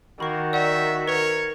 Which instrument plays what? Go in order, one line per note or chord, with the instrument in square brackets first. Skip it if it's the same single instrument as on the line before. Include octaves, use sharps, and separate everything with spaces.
[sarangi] D#3 [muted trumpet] A#3 [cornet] F#4 [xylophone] B5 C#6
[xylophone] D5 F#5 [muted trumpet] E5
[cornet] A#4 [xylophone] B4 [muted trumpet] C#5